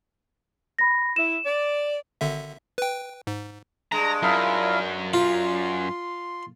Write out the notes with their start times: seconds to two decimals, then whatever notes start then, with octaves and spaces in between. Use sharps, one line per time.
0.78 B5 A#6
1.16 E4 E7
1.45 D5
2.21 G#1 D3 E5
2.78 B4 G5
3.27 G#2
3.92 G2 G#3 A#5
4.22 F#2 E4 F4 A#4
5.14 F4 C6